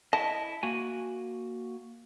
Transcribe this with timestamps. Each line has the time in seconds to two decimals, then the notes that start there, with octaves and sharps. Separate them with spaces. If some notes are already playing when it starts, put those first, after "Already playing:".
0.13 E4 D#5 A5
0.63 A#3 F#4 G#5